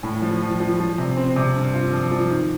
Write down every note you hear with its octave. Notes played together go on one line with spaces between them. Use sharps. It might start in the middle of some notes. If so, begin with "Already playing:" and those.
A2
F3
F3
F3
F3
C3
C4
C3
G2
F4
F3
F3
D#3